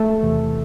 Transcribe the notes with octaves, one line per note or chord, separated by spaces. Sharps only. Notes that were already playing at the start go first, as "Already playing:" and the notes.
Already playing: A3 A4
E2 C3 E3